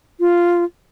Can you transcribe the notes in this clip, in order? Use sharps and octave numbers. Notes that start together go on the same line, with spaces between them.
F4